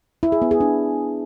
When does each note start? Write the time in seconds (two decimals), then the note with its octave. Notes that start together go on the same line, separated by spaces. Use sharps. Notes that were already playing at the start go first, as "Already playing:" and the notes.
0.23 E4
0.32 G#4
0.42 B3
0.51 G#4
0.60 D4